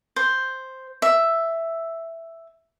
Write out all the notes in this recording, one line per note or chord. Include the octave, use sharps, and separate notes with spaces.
C5
E5